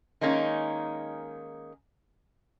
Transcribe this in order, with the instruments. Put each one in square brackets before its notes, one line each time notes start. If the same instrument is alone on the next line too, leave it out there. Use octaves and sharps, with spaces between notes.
[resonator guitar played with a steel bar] D#3 G#3 A#3 C#4 D#4